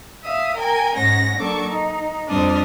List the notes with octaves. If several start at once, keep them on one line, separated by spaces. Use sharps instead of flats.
E5 F5 D#6
A#4 G5 G#5
G#2 C#4 F#5 A#6
F#3 A#3 D4 A4 C#6 D6
D#4
F2 G3 C4 D4 D#6 F6